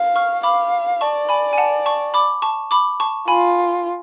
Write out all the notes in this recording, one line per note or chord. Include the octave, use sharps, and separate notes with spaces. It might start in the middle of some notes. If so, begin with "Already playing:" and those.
Already playing: F5
C#6 F6
F5 B5 D6
D5 A5 C#6
G#5 B5
G#5
F#5 A5
A5 C#6
B5 D6
A5 C#6
B5 D6
A5 C#6
F4 G#5 B5